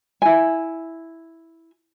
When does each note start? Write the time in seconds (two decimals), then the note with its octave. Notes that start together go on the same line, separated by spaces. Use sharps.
0.22 E4 G#5